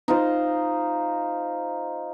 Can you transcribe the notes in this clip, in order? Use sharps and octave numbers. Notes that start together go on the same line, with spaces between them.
D#4 F4 C5